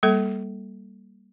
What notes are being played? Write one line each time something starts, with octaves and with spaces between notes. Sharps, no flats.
G3 A#3 A4